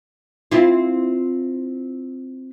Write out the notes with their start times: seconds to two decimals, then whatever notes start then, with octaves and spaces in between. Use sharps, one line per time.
0.52 C4 E4 F4